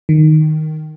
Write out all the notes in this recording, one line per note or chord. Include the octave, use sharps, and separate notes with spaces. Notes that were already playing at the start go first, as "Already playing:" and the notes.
D#3